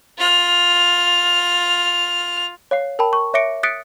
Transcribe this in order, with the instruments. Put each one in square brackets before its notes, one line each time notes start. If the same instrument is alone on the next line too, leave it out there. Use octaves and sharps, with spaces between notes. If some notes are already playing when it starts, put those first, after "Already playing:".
[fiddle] F4 F6
[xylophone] C#5 F5 C7
A#4 G5 A5 B5
C#6
C#5 E5 D6 A#6 C#7 D7
D#6 F#6 A6 B6 C#7 D7